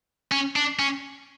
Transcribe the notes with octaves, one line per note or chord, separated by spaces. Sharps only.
C#4
D4
C#4